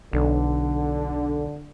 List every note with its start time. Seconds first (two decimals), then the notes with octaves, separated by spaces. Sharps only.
0.13 B1 D3